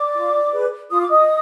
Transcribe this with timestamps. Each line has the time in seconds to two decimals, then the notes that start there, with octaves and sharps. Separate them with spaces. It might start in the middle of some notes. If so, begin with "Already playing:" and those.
Already playing: D5 D6
0.15 F4
0.53 G#4 B4
0.90 F4 D#6
1.01 D6
1.11 D#5 D#6